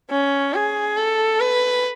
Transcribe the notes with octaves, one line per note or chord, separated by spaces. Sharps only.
C#4
G#4
A4
B4